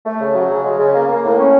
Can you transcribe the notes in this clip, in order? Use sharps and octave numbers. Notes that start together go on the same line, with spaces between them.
A3
C#3
F#3
C#3
G#3
C#3
A#3
A#3
A2
C#4